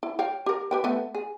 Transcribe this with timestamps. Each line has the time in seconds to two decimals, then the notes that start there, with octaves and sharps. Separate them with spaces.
0.03 E4
0.19 C#5 F5 G5
0.46 G4 A#4
0.71 G4 B4 G5
0.84 A3 B3
1.15 G#4